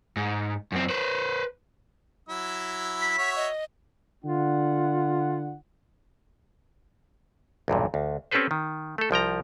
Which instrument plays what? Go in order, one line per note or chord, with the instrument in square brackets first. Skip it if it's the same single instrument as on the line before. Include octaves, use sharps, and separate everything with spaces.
[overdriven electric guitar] G#2
F#2 C4
B4 C5
[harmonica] F#3 E4 E6
[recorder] B6
[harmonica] F#4 C#5 E5
[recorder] D#5
[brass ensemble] D3 D4 F#5 [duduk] F4
[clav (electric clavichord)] B1 E2 G2 A#2
D2
C4 C#4 G4 A4 B4 C5
D#3
A3 A4
C2 F3 G5 A#5